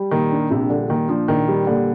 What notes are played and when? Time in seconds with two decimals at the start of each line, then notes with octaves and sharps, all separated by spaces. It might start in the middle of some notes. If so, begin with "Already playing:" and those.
Already playing: G3
0.11 A#2 D#3
0.32 D4
0.51 A#1 C3
0.70 D3 G3
0.89 A#2 D#3
1.08 F3 D4
1.28 A#1 D#3
1.48 G3
1.67 A#2 D3